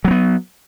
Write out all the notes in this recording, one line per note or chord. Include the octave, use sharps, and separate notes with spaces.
F#3 A#3 B3